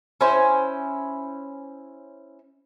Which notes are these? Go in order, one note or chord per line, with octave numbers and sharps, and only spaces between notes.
C#4 E4 C5